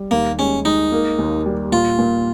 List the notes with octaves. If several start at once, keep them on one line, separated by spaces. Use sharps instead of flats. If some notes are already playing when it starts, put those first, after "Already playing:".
Already playing: G3
D#2 A#3
G#3 C#4
G#3 D#4
A#3
D#2
G3
A#2 F4
A#2